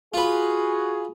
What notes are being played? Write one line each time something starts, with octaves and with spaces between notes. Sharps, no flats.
F4 F#4 G#4 B4